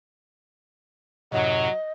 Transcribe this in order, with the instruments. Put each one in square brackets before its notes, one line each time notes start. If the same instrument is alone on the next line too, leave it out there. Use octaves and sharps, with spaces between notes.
[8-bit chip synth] F#2 A2 C3 [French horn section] F#3 [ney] D#5